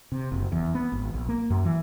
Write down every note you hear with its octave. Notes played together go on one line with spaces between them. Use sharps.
C3
F#1
E2
B3
G#1
A#1
A#3
F#2
E3